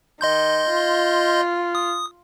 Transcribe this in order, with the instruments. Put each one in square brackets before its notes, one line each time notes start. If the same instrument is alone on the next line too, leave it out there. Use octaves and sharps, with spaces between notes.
[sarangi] D#3 [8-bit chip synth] D#5 C6 G6
[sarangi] F4
[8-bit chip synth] D#6